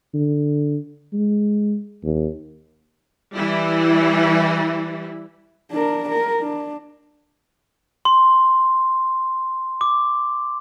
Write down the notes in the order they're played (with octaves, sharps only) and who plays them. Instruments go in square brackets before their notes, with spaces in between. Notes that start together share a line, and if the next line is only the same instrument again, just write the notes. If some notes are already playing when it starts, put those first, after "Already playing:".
[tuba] D3
G#3
D#2
[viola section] E3 G3 E4
[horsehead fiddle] D4 A#4
A#4
D4
[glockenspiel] C6
D6